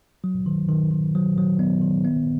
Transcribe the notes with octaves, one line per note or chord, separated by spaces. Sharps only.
F#3
D#3
D#3
D#3
F#3
F#3
B3
D#3
B3